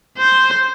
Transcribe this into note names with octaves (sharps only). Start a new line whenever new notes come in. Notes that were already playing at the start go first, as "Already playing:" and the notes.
C5